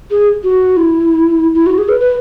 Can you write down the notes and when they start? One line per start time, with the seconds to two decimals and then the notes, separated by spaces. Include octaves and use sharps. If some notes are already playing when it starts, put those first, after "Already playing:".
0.11 G#4
0.44 F#4
0.77 E4
1.55 E4
1.66 F#4
1.78 G#4
1.89 B4
2.00 B4